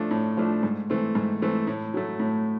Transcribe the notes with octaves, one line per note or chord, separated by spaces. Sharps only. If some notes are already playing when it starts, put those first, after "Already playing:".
Already playing: A2 F3 A3 D4
A2
F3 A3 D4
G#2
E3 A3 C4
G#2
E3 A3 C4
A2
F#3 A3
A2